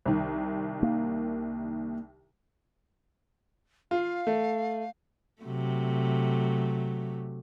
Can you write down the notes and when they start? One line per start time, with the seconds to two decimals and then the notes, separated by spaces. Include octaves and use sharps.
0.06 C2 D#3
0.83 A#3
3.91 F4 F5
4.27 A3
5.42 C3 F#3 A3